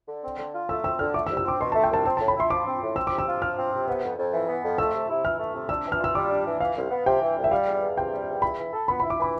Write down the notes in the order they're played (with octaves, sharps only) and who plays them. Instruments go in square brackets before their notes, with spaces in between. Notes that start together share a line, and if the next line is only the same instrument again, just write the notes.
[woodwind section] D3
C4
D3
F4
[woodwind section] A3 [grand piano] E6
[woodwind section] C4 [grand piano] E6
[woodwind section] D3 [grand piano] F6
[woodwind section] A3 [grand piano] D6
[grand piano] E6
[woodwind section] C2
[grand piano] E6
[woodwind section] C4 [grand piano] D6
[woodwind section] B2 [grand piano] C6
[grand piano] A5
[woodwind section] A3
[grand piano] G5
[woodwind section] C2 [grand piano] A5
[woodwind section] C4 [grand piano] A5
[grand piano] A5
[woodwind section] A2
[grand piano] B5
[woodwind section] E4 [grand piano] C6
[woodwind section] F3 [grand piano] D6
[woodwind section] C4
A2
[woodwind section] C4 [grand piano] E6
[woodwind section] C3 [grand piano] D6
[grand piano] E6
[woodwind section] F4
[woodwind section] F3 [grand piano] F6
[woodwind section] C4
C3
B3
F2
F2
E3
B3
F2
[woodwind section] A3 [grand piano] E6
[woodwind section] C3
E4
[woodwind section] E3 [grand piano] F6
[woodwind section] A3
C3
[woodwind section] D4 [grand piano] E6
[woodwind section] E3
[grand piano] F6
[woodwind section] F4 [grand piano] E6
[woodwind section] G3 [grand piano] D6
[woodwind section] D4
E3
[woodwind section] E3 [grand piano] F5
[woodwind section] C2
B3
[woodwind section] C3 [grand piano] G5
[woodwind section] E3
C2
[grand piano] E5
[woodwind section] G3 [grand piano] F5
[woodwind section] E2
E2
[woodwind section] C3 [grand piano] G5
[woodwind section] G3
E2
[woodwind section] E4 [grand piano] B5
[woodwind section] E3
A4
[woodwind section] B3 [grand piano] B5
[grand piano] B5
[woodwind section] E4
[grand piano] D6
[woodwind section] E3 [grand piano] B5